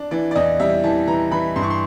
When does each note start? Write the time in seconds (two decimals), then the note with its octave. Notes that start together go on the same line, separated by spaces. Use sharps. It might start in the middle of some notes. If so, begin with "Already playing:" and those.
Already playing: D4
0.11 E3 D5
0.31 D5
0.35 E2 D#5
0.60 G3 E5
0.84 E3 A5
1.08 E3 A#5
1.31 E3 B5
1.56 G2 C6
1.63 C#6
1.70 C6